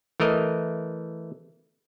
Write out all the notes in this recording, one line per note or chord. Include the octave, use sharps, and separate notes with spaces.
E3 A3 A#4 D#5